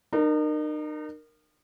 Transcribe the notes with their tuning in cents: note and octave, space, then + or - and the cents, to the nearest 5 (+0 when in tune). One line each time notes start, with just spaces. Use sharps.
D#4 -40 A#4 +0